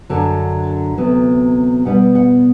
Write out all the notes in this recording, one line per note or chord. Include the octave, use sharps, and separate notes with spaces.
F#2 D3 F#3
D2 C3 F#3 B3
B2 G3 B3 F#5
F#5